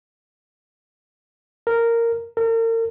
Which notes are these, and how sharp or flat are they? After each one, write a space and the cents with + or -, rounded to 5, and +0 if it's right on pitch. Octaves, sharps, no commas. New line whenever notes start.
A#4 -10
A#4 -40